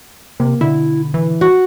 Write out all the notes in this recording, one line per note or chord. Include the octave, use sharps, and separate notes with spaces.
C3 A#3
B2 D3 E4
E3
F#4